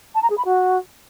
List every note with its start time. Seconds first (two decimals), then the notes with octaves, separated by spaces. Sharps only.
0.15 A5
0.22 A#5
0.30 G#4
0.38 B5
0.45 F#4